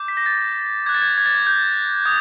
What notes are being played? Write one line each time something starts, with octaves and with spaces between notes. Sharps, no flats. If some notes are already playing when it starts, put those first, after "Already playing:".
Already playing: D6 G6
B6
A#6
A6
D6 F#6 G#6
A6
G#6
A6
G#6
A6
G#6
G6
D#6 G#6